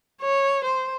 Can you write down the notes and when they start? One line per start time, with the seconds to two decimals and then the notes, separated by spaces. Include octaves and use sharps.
0.22 C#5
0.65 C5